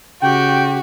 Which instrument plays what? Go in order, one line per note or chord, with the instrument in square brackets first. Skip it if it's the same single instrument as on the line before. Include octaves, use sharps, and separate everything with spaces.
[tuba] C#3 [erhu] F#4 [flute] G4 [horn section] G5